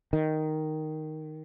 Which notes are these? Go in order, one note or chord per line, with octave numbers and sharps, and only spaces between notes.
D#3